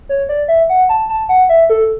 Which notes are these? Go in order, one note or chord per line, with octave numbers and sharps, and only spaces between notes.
C#5
D5
E5
F#5
A5
A5
F#5
E5
A4